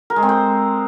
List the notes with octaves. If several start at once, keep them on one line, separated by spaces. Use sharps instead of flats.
A#4
G#3
C4
C5